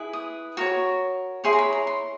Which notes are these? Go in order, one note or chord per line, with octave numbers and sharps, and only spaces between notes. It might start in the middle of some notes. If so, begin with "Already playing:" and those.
Already playing: E4 G#4 B4
D#6
F#4 A#4 C#5
E4 G#4 C#5 C6
A#5
B5
A#5
C6